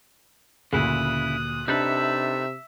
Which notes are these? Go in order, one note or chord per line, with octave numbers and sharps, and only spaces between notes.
D2 A#2 C#3 E4 D#6 F#6
C3 D4 D#4 A4 B4 E5